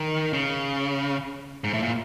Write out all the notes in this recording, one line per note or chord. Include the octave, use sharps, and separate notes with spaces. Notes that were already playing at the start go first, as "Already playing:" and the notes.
Already playing: D#3
C#3
G#2
A2
A#2